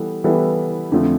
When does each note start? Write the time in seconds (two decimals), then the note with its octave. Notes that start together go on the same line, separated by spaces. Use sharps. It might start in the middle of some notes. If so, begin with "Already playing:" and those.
Already playing: E3 G3 B3 E4 A4
0.24 E3 G3 B3 E4 A4
0.92 F2 D3 F3 A3